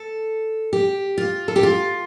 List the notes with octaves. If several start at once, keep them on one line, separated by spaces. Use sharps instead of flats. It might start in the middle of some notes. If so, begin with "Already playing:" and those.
Already playing: A4
G4
F4
A4
G4
F4